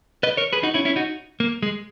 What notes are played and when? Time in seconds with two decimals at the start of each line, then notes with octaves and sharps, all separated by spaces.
0.23 B4 D#5
0.37 A#4 C#5
0.53 G#4 B4
0.63 D#4 F#4
0.74 C#4 E4
0.85 C#4 E4
0.96 D#4 F#4
1.40 A#3
1.63 G#3